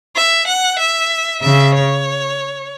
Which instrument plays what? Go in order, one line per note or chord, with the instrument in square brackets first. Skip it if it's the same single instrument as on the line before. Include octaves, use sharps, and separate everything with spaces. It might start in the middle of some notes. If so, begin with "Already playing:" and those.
[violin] E5
F#5
E5
[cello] C#3 [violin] E5
[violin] C#5